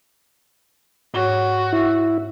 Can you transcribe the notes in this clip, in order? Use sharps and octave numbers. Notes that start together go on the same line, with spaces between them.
G#2 F#4 C#5
E4